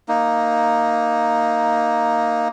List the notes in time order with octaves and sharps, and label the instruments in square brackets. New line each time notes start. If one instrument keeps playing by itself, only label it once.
[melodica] A#3 D#4